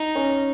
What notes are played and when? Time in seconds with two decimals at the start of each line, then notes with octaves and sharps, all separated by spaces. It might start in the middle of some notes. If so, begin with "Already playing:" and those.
Already playing: D#4
0.15 C#4